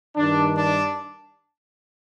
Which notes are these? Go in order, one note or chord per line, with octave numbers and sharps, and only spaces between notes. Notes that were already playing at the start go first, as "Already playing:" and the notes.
G2 D#3 G3 D4
D4